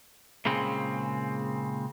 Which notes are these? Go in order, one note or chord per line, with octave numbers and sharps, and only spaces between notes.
A#2 C#3 G#3 C4